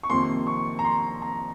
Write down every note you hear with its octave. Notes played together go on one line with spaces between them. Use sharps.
C#6
F2 C3 D#3 A#3 C6
C#6
A#5
C6
A#5